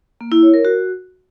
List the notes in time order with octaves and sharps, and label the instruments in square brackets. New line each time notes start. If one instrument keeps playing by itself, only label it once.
[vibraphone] A#3
E4
C#5
A#4
F#4